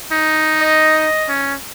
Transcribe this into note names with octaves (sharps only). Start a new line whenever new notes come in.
D#4
D#5
C#4